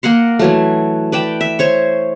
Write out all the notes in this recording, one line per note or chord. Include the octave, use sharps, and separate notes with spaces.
A#3 A#4 F#5 C6
E3 F#3 A3
B4 D5 G5 A5
E5
C5 C#5 C#6